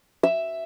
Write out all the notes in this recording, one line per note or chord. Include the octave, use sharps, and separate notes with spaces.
E5